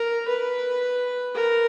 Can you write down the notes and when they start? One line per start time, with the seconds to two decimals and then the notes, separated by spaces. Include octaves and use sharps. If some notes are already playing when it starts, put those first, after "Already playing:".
Already playing: A#4
0.28 B4
1.35 A#4